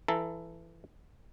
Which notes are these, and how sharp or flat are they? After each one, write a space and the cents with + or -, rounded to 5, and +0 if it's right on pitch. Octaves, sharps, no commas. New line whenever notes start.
E3 +15 A4 +0 A#5 +0